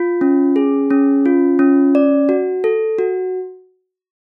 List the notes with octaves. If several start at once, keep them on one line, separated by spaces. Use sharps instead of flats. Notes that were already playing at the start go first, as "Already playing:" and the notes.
Already playing: F4
C#4
G#4
C#4
F4
C#4
D5
F#4
A4
F#4